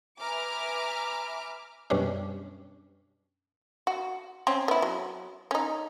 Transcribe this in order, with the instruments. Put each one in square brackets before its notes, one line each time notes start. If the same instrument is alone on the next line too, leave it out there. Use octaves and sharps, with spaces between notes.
[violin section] B4 E5 G#5 A#5 D6 F6
[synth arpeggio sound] F#2 B2 G3 C#4 D4
[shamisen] F#4
C4 C#4
B3 E4
F#3
C#4 D#4